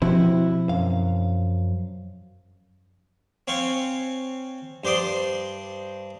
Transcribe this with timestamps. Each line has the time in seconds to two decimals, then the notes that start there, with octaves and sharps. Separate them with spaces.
0.02 B2 F3 C4 E4 F#4 G4
0.69 F#2 F5
3.48 C4 C#5 F5 G#5
4.84 G2 C5 D5 C6 D#6